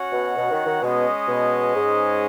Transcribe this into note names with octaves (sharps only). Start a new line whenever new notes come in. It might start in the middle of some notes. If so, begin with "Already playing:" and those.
Already playing: C#4 F#4 C#5 F#5
B2
B2
D#3
D#3
B2 G#3 C#4 G#4 D#5
B2
G#2